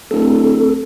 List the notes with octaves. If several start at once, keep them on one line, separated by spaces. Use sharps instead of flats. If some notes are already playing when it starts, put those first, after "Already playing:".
D1 A3 C4 A4